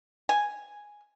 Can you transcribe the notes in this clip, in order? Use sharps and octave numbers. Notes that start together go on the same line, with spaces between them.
G#5